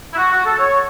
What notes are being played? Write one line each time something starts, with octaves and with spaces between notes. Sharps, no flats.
E4
F#4
F#4
A4
C#5